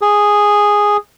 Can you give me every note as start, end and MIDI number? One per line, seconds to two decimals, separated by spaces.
0.01 0.97 68